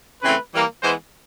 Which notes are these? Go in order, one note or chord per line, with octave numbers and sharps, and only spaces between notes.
C#3 E3 A3 C4 B4
E3 G3 A#3
E3 G#3 B3 C5